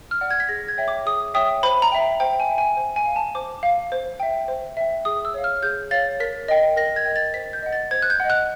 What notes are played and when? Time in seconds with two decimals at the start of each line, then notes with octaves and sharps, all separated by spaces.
0.11 F6
0.21 D5 F#5
0.31 G#6
0.40 B6
0.49 G#4 A#6
0.68 G#6
0.77 C#5 E5 G5
0.88 D6
1.06 G#4 D#6
1.34 C#5 E5 G5 D#6
1.63 C5 B5
1.82 A#5
1.92 E5 G5
2.20 C5 G5
2.40 G#5
2.49 E5 G5
2.58 G#5
2.77 C5
2.96 G#5
3.06 F5
3.16 A5
3.35 C5 D6
3.63 F5
3.92 C5
4.20 E5 G5
4.48 C5
4.77 E5 G5
5.05 G#4 D#6
5.25 E6
5.34 C#5 F5
5.44 F6
5.63 G#4 G6
5.91 C#5 F5 A6
6.20 A#4 B6
6.48 D#5 G5
6.76 A#4 A#6
6.96 G#6
7.05 D#5 G5
7.16 A6
7.34 C5 B6
7.53 G6
7.62 D#5 F#5
7.73 A6
7.91 C5 G#6
8.02 F#6
8.10 G6
8.20 D#5 F#5
8.30 F#6